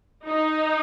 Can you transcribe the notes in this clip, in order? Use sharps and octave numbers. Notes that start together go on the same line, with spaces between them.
D#4